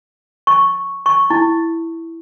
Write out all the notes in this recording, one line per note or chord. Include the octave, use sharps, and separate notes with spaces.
C#6
C#6
E4